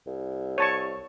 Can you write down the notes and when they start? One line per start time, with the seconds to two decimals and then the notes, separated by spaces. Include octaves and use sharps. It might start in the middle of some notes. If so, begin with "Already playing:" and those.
0.06 C2
0.58 C#5 A5 C#6